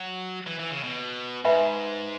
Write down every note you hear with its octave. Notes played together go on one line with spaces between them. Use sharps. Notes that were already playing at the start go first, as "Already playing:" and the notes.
Already playing: F#3
E3
E3
C#3
B2
G#2 B4 E5 G#5 B5